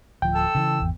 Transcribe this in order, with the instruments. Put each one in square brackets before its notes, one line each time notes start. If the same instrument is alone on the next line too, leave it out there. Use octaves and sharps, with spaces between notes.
[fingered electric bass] D1 F3 [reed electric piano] G5
[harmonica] A4 E6
[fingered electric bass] C#3 E3
G#1 E2